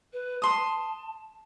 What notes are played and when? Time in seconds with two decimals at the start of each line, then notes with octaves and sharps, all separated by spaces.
0.12 B4
0.42 A5 C6 D#6